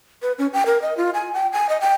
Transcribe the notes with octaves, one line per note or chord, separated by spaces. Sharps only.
B4
C#4
G5
A#4
D#5
F4
G#5
G5
G#5
D#5
G5